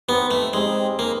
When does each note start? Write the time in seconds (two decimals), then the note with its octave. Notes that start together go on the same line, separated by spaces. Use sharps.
0.08 G3 B3 C4 D#4 G4
0.31 A3
0.53 G3 G#3 C4 D#4 G4
0.99 A#3 D#4 G#4 B4 D5